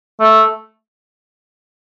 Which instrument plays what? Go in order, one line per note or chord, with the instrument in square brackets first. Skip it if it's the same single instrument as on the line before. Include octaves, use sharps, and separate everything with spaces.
[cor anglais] A3